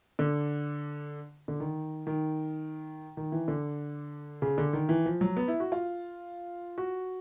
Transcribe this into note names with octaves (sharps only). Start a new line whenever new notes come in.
D3
D3
D#3
D#3
D#3
E3
D3
C#3
D3
D#3
E3
F3
F#3
B3
E4
F#4
F4
F#4